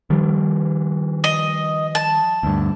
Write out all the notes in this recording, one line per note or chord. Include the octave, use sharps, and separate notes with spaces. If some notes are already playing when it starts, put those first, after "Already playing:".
D#3 F3 G3
D#5
A5
D2 G2